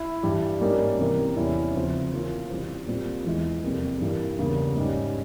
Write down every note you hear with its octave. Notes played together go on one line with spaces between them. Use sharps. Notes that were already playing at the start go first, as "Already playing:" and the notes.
Already playing: E4
G2 E3 G3
G#2 G3 A#3 C#4
C3 E3 G3 A#3
E2 C3 G3 C#4 E4
C#3 F3 C4 F4
E3 A#3 C#4 F4
C3 E3 G3 C4
A#2 G3 C4 F4
E2 E3 G#3
F2 C3 G3 A#3
G2 E3 G3 A#3
E2 C#3 E3 G3 A#3
G#2 G3 C#4